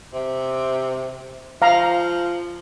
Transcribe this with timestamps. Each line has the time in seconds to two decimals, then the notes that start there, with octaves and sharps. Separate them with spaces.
0.13 C3
1.62 F3 F5 A#5